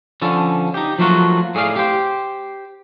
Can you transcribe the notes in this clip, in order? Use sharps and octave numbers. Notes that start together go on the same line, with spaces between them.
D3 F3 C#4 A4
D#4 G4
F3 F#3 A3 A#3 F4 F#4
A2 G#4 D5 E5 F5
G4 C5